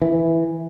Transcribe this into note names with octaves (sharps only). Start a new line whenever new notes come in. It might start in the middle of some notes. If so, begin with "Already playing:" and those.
E3